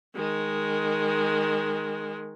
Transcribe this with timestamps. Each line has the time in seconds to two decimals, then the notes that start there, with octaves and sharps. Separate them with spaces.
0.15 D#3 G#3